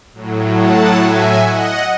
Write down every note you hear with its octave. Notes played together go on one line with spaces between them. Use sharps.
A2 F#3
F#5 A5
E5 G#5
D#5 F#5